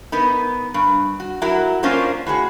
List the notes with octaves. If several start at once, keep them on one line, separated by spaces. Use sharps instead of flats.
B3 D#4 A#4
G2
F#4
F#3 E4 F#4 A#4
A#3 C#4 D4 F4 A#4 C5
A2 F#4 G#4